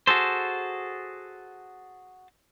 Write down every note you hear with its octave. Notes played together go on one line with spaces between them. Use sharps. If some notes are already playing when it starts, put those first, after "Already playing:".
F#4 G#4 A4 C5